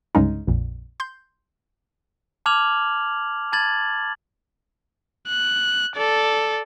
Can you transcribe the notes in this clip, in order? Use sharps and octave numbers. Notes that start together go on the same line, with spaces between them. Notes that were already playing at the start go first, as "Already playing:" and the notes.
C2 G2 C#3 G#3 C#4 D#4
A#1 F2 A#2
C6 G6
A5 D6 F6 G#6 F7 F#7
A5 B5 G#6 A6 F#7
F#6
A4 D5